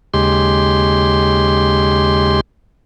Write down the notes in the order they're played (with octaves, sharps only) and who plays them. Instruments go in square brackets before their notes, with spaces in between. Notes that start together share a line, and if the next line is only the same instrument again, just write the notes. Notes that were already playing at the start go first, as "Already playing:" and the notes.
[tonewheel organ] D#2 C#3 G#3 G4 C6